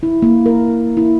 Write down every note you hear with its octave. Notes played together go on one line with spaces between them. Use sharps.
E4
A#3
A#4
E4